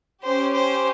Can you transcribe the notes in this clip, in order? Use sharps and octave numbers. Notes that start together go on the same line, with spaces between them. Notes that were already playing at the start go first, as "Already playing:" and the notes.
C#4 G4 C5
C5